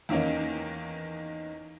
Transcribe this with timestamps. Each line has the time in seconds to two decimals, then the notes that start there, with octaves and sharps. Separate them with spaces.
0.09 E2 D#3 A#3 C#4 D#4